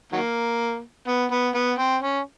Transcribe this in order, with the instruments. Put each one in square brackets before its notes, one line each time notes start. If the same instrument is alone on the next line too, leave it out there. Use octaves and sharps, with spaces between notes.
[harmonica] D#3 F#3 A#3
B3
B3
B3
C4
C#4